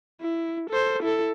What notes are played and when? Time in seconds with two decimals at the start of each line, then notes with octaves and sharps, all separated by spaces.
0.21 E4
0.70 A4 C5
1.03 E4 A4